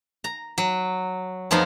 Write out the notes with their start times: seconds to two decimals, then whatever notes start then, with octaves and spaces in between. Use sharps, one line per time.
0.24 A#5
0.58 F#3
1.51 F2 F3 B3 D#4 F5